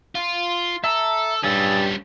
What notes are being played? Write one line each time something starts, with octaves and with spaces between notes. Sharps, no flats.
F4
A4 E5 A5 A#5 E6
G2 G3 C#4 G#4 F5 E6 A6